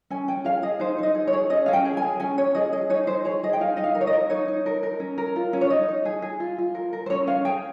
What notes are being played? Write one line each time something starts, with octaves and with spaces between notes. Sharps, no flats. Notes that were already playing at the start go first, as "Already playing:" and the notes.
C#4 G#5
C#4 G5
G#4 F5
G#4 D#5
D#4 C5
D#4 D#5
G#4
C#5
G#4
C#4 D#5
C#4 F5
G5
G#4
G#5
G#4
C#4 G#5
C#4 C#5
G#4 D#5
G#4 D#5
D#4 C#5
D#4 C5
G#4 C#5
G#4 D#5
G5
D#4 F5
D#4 D#5
F5
A#4
C#5
D#5
A#4
D#4 C#5
D#4
A#4
A#4
C#4
A#4
F4
C#4
C#5
D#4 D#5
D#4
G#4
G#4
F4
F4
A#4
A#4
C5
C#4 C#5
C#4 F5
G#4 G5